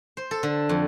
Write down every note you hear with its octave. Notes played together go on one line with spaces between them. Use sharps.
C5
A4
D3
F2